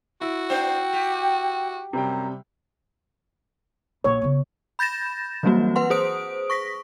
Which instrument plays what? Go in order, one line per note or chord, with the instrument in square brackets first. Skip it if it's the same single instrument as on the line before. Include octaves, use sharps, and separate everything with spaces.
[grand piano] E4 [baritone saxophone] F#4
[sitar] B3 D4 C5 [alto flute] G5
[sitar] G4
[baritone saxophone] F#2 [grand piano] C3 G3 G5 [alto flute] A#5
[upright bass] A#1 [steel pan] C#5
[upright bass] C#3 B3
[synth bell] B5 G6 A6 A#6 E7
E3 F#3 G3 A#3 C4 F#4
B4 F#5 C6
G#4 B4 C5 D#6 D7
C#6 A#6 B6